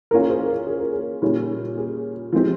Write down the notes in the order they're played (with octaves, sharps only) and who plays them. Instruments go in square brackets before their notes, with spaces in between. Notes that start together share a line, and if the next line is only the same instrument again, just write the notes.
[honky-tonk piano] E3 A#3 C#4 F4 [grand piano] A#4
[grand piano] A#4
G#4 C5
A#4
G#4
A#4
G#4
[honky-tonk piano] A#2 G3 C#4
[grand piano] G#4
[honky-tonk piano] F3 G#3 C4 G4